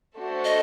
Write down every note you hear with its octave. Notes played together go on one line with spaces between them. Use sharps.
A3 D4 F#4 A4 C5
D#5